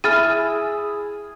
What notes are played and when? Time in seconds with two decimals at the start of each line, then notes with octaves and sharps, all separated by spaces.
0.04 E4 G#4 F6 A6 D#7